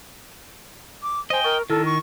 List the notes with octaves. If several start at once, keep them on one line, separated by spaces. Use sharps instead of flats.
D6
C5 D#5 G5 G#5 A#6
A#4 C#6 A6
D#3 E4 A4 E6 F6
C#6